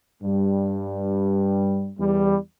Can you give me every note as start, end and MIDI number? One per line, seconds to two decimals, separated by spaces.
0.23 1.92 43
0.23 1.92 55
1.99 2.36 40
1.99 2.36 55